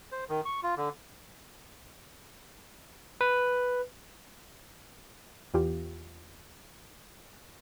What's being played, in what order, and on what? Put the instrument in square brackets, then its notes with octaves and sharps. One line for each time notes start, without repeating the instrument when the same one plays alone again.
[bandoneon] C5
D#3
C#6
F4
D3
[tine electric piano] B4
[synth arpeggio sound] E2 F4 G4